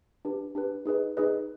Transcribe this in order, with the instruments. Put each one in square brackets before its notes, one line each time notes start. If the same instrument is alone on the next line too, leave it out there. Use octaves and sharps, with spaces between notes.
[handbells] D4 G4 B4
D4 G4 B4
D#4 G#4 B4 D#5
D#4 G#4 B4 D#5